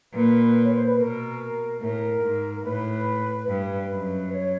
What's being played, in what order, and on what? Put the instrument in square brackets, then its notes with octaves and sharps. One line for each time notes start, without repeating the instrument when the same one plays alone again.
[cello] A#2 [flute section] B4
[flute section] C#5
C5
B4
[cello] B2 [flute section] A#4
[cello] A2 [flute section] A#4
[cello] G#2
[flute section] A#4
[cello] A2 [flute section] B4
[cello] G2 [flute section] B4
[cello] F#2
[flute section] C#5